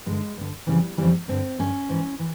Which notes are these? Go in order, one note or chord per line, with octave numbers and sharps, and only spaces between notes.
G2 D3 G#3
G2 D3
F2 C#3 E3 G3
F2 C#3 E3 G3
G2 D3 C4
G2 D3 C#4
G#2 E3
E3